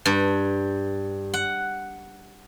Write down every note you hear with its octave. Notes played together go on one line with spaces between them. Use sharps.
G2
F#5